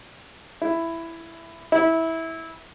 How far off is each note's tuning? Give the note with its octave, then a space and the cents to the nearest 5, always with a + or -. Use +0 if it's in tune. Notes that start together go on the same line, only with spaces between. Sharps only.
E4 +10
E4 -15